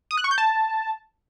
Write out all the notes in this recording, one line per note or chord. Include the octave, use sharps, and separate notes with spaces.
D#6
F#6
C#6
G6
A5